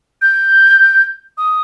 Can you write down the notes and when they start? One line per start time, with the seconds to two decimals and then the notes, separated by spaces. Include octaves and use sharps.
0.22 G6
1.38 D#6